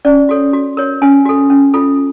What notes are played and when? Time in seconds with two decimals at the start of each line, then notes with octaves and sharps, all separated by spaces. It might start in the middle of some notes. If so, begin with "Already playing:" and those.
0.05 C#4 D5
0.29 F#4 A4 C#5
0.53 F#4
0.77 A#4 C#5
1.02 C#4 G#5
1.25 F#4 A4
1.50 C#4
1.74 F4 A4